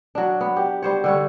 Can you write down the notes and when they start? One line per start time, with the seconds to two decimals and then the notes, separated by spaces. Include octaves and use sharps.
0.15 F#3 D4
0.41 B3
0.57 G4
0.82 G3 C5 C#5
1.04 D3 G3 C#5